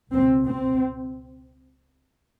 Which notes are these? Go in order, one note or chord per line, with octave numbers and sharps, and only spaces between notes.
C#2 B2 C4
C4